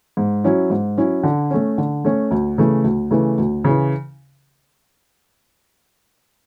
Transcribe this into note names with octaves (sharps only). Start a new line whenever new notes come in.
G#2
F#3 C#4 E4
G#2
F#3 C#4 E4
D3
A3 C#4
D3
A3 C#4
D2
C#3 E3 A3
D2
C#3 E3 A3
D2
C#3 E3